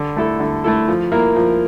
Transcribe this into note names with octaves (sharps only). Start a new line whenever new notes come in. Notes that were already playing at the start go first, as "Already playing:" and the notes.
Already playing: D3
A3 E4 A4
D3
A3 E4 A4
F3
A#3 E4 A#4
F3